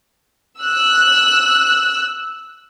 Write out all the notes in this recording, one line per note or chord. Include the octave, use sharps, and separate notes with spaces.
E6 F#6